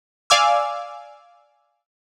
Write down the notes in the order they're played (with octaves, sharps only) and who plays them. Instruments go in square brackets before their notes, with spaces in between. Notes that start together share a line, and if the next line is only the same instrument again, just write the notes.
[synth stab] D5 F5 G#5 D6 E6